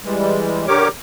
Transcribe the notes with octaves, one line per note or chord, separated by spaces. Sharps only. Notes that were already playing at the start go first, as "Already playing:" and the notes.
E3 G3 G#3
D3 G4 A#4 C#5 D6